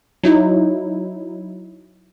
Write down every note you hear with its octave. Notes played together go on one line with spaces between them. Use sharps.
F#3 D#4 E4